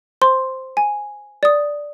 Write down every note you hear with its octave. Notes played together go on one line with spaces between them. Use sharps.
C5 C6
G#5
D5 D#6